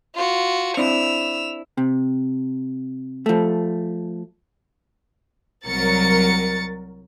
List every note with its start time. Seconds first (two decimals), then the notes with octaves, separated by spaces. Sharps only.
0.15 F4 F#4
0.77 C4 D4 E4 E6 F7
1.77 C3
3.26 F3 A3
5.66 C2 F#3 A#4 A6 C#7